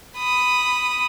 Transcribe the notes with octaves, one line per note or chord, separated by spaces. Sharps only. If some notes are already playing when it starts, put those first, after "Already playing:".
B5 D#6